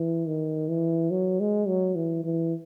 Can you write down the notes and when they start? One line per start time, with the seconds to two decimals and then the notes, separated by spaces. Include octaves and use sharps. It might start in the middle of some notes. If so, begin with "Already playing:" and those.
Already playing: E3
0.26 D#3
0.69 E3
1.11 F#3
1.40 G#3
1.68 F#3
1.95 E3
2.25 E3